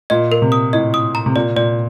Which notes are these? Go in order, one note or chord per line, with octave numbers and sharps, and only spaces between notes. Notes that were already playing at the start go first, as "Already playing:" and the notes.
A#2 D#5
A#4
C3
D#6
A2 D#5
D#6
A#5
C3
A#2 D5
A#2 D5